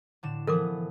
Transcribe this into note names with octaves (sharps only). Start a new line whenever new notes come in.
A2 D3 E7
E3 F3 B3 A4 A#4 D6